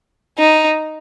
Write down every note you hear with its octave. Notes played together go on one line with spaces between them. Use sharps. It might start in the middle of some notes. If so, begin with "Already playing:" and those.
D#4